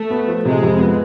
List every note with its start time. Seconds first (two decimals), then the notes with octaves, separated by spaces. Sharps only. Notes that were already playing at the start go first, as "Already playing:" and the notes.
Already playing: A3
0.10 B3
0.28 F3
0.45 C3 G#3
0.63 F2
0.79 B3